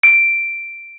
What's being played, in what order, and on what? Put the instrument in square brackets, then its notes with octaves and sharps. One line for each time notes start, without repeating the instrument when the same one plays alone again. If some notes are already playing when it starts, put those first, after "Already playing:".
[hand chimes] D7